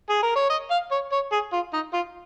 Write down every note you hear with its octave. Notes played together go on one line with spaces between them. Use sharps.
G#4
A#4
C#5
D#5
F5
C#5
C#5
G#4
F4
D#4
F4